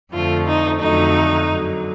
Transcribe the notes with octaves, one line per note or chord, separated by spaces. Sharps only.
F2 D3 F3 A3 F4
D#4
F2 D3 F#3 A3 D#4
F#2 D3 F#3